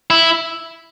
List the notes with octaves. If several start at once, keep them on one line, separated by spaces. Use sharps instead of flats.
E4